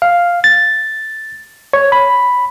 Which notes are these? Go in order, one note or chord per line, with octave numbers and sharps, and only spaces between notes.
F5
A6
C#5
B5